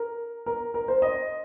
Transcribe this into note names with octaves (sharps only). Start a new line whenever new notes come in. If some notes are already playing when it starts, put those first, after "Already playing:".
Already playing: A#4
A#4
A#4
C5
D#5